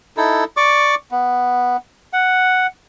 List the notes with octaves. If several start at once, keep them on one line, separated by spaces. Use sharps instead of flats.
D#4 E4 A4
D5 C#6 D6
B3
F#5